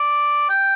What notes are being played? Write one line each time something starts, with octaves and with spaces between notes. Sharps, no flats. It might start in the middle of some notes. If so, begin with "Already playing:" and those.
Already playing: D5
G5